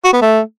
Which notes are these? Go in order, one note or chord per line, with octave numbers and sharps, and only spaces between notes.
F#4
B3
A3